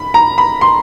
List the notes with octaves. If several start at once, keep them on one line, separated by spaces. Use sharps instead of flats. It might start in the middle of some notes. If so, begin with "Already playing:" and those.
Already playing: B5
A#5
B5
C6